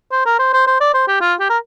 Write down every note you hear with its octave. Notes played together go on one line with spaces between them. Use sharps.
C5
A#4
C5
C5
C5
D5
C5
G4
F4
G4
A#4